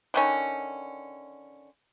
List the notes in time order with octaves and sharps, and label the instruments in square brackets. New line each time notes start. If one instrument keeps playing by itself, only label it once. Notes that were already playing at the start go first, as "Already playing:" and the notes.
[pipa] D3 D#3 C#4